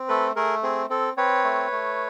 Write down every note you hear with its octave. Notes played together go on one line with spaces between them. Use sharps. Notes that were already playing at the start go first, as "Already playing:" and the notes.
Already playing: C4
A3 A4 B4
A3 G#4 A#4
C4 G#4
C4 A4
C4 B4 C#5
A3
A3